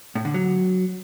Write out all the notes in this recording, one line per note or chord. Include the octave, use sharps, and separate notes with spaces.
A2
D3
F#3